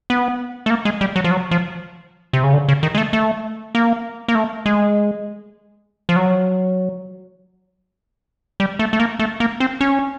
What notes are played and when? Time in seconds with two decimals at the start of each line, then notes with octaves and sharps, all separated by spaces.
0.10 B3
0.66 A3
0.70 A#3
0.85 G#3
1.01 G3
1.16 F#3
1.24 F3
1.31 F#3
1.51 F3
2.33 C3
2.44 C#3
2.53 D3
2.68 C#3
2.83 D#3
2.95 G#3
2.98 A3
3.13 A3
3.75 A#3
4.28 A#3
4.35 A3
4.66 G#3
6.09 F3
6.16 F#3
8.60 G3
8.79 A3
8.93 A3
9.00 A#3
9.19 A3
9.40 A#3
9.60 C4
9.81 C#4